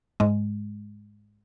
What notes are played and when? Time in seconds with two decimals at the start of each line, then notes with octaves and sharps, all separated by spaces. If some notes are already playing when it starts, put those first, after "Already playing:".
0.20 G#2 G#3